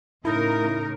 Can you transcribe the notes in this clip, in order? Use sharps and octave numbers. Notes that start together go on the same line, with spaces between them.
A2 C#3 D#4 E4 A#4